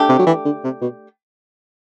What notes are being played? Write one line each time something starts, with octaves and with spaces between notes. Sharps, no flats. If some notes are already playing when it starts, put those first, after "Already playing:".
Already playing: A3 D4 G4
C3
F#3
E3
D3
C3
B2